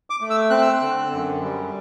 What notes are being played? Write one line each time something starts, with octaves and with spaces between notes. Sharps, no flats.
D6
A3
E6
C4 F#6
E6
F#6
D3
F#2
G3